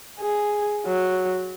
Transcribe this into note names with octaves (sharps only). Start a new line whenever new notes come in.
G#4
F#3